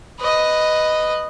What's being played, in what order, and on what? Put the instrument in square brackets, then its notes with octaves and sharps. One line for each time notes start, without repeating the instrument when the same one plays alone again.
[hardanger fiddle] B4 D#5